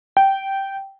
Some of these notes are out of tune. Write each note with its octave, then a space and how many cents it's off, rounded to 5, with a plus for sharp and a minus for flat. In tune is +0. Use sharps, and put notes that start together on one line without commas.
G5 -10